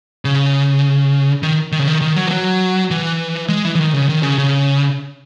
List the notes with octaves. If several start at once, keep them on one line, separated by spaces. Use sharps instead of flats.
C#3
D#3
D#3
C#3
D#3
D#3
F#3
E3
F#3
E3
G#3
E3
E3
D#3
C#3
D#3
C#3
C#3